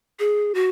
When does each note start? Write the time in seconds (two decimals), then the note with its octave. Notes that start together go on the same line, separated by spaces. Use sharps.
0.19 G#4
0.55 F#4